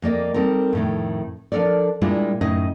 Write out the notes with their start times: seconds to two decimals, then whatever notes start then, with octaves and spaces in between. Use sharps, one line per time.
0.02 F2 A#3 D5 D#5
0.34 G3 C4 D#4 A4 A#4
0.73 F2 A2 D#3
1.52 F3 D4 A4 A#4 D5
2.01 A#2 G3 G#3 D4 E4 F4
2.41 F#2 A2 C#3 D#4 D#5